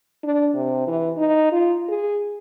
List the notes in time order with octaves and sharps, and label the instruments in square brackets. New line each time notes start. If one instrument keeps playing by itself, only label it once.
[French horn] D4
C3
E3
D#4
F4
G#4